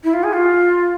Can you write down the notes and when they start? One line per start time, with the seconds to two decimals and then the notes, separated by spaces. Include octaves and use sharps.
0.04 E4
0.13 F4
0.23 G#4
0.33 F4